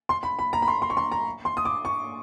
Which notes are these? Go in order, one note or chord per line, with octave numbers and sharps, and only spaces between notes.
C6
B5
B5
A#5
B5
C6
C6
C#6
C6
A#5
C6
D#6
D6
C#6